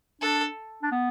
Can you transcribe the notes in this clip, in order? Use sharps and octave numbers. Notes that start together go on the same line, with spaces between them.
D4 A4
D4
B3